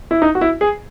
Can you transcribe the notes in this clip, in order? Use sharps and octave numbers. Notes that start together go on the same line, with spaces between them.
E4
D#4
F#4
E4
G#4